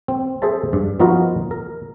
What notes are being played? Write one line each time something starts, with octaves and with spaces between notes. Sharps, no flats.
C4
G#4 A4 C5 E5 A5
G2
F3 B3 D#4 F4 F#4 A#4
A#4